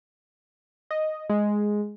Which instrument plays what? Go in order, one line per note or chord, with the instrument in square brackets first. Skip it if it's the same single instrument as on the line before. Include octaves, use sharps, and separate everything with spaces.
[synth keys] D#5
G#3